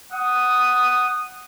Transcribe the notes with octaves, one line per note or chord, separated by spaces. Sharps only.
F#5 D#6